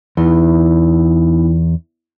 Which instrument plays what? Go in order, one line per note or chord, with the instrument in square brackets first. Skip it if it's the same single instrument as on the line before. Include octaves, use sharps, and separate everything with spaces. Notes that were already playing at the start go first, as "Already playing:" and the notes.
[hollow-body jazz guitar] E2 [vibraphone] B3 D#4 E4